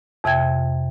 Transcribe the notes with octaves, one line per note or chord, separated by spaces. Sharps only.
F2 C3 E5 G5 G#6